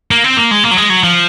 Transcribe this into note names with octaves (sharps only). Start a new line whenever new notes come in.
A#3
C4
A#3
G#3
A#3
F#3
G#3
F#3
F3